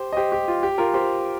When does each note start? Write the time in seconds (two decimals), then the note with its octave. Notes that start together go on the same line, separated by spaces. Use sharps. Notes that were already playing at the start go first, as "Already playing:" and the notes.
Already playing: G4 C5
0.13 D#5
0.17 G4 C5
0.32 G4
0.48 F4
0.63 G4
0.78 F4 A#4
0.94 G4 C5